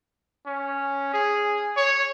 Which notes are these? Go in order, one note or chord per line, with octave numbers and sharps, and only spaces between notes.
C#4
G#4
C#5